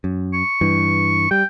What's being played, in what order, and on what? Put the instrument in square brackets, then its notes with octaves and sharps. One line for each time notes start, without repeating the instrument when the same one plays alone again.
[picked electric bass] F#2
[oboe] C#6
[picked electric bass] G2 E3
[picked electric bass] G3 [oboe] G5